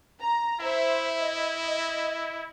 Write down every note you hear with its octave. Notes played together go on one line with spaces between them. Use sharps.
A#5
E4 C5 E5
D#5